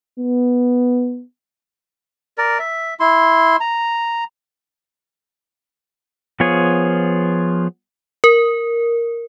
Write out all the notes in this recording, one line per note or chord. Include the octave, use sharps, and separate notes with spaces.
B3
A#4 D5
E5
E4 C6
A#5
F3 B3 F4 G#4 C#5
A#4